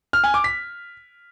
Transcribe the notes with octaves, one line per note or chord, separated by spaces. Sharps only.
F6
G#5
D6
B6